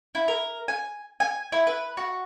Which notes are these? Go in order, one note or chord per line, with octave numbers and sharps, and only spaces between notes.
E4
A#4
G#5
G#5
E4
B4
F#4